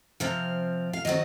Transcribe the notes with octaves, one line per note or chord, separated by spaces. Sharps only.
C3 F3 C4 F5
F5
D#3 F#3 C4 D#5